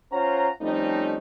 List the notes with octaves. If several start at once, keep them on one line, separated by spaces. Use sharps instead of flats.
C#4 F4 C5 C#5 F#5 A#5
F3 G3 A3 C4 C#4 D#4